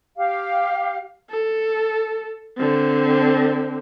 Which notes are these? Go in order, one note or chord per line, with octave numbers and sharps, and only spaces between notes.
G4 F5
A4
D3 C4